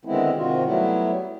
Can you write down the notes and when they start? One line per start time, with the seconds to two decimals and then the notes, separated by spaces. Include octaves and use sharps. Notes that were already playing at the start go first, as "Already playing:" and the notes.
0.05 D3 D#3 G#3 B3 C4 E4
0.34 G#2 C3 D#3 F4 F#4
0.64 F#3 G3 A3 B3 E4